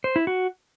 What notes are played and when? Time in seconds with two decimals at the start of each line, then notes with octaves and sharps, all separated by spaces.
0.04 C5
0.16 E4
0.27 F#4